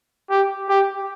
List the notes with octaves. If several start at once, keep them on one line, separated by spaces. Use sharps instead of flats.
G4
G4